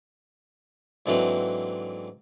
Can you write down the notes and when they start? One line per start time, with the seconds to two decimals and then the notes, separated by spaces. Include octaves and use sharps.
1.06 G#2 D3 E3 F#3 A#3 C4